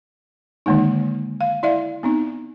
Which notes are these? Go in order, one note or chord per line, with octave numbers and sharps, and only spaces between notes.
D3 D#3 G#3 A#3 D#4
F5
E4 D5 E5 F5
B3 C4 D#4